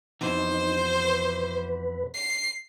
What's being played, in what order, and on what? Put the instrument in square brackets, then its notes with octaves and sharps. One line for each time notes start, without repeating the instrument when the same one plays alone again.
[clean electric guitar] F2 B2 E3 [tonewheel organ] D#4 [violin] C5
[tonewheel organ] B4
[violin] C7